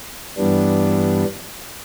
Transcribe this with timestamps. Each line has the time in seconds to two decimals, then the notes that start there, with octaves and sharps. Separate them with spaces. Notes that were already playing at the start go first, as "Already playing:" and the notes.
0.37 G2 E3 G3 B3 D4